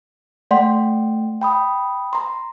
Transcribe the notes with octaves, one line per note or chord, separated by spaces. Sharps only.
A3 D5 F#5 G5 C6
G5 B5 D#6
A#5 C6